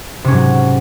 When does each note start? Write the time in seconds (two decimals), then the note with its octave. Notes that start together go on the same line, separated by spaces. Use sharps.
0.24 C3
0.28 C#4
0.31 G#2
0.34 F#3